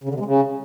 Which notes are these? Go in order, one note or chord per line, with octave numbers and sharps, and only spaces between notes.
C#3
D3
C3
G#3
C#3